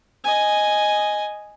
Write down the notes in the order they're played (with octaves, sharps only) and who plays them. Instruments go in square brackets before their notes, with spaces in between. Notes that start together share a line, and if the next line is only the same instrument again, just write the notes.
[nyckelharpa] D#5 G#5